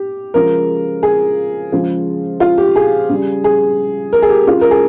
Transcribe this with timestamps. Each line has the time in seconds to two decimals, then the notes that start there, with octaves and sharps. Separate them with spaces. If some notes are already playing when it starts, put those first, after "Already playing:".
Already playing: G4
0.34 C#3 F3 G#3 A#4
1.03 G#4
1.72 C#3 F3 G#3
2.40 F4
2.58 G4
2.76 G#4
3.09 C#3 G3
3.44 G#4
4.13 A#4
4.22 G#4
4.29 G4
4.47 C#3 G#3 F4
4.61 A#4
4.71 G#4